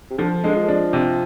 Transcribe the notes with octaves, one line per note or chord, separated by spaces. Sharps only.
C3
D3 F3
D3 G#3
F3
D4
C3